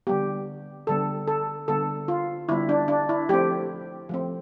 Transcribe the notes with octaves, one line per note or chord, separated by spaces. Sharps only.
D3 G3 B3 G4
D3 G3 B3 A4
A4
D3 G3 B3 A4
F4
D3 G3 B3 E4
D4
D4
E4
F3 A3 C4 G4
F3 A3 C4